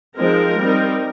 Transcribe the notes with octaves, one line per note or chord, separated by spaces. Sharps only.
F3 G#3 C4 D#4 A#4
G3 C4 D#4